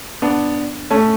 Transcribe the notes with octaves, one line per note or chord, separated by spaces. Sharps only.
B3 D4
A3 C#4